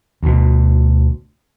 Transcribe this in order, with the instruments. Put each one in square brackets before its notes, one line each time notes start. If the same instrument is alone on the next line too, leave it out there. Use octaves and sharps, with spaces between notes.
[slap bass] D2 B2